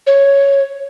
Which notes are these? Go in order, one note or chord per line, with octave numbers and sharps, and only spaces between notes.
C#5